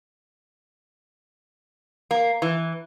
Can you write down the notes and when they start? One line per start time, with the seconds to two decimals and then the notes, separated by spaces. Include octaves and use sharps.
2.11 A#3
2.42 E3